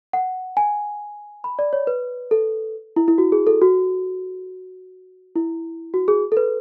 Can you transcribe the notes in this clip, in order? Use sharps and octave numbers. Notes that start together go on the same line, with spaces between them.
F#5
G#5
B5
D5
C#5
B4
A4
E4
E4
F#4
G#4
A4
F#4
E4
F#4
G#4
A4
B4